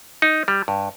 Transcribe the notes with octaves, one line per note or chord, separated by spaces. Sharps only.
D#4
G3
G2